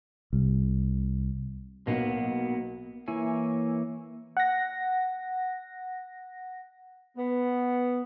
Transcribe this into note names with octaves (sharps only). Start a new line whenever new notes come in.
C2
B1 F#3 A#3 B3
E3 A#3 E4 C#5 G#5
F#5 A#6
B3